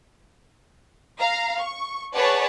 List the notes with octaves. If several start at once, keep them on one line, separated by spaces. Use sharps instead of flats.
F5 A#5
C#6
G#4 B4 C#5 D5 F#5 A5